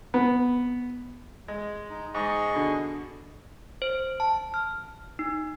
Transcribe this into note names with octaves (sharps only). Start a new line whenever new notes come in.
B3
G#3
D#4
G#2 G#4 D#5 C#6
B2 D3
C5
A5
F6
D#4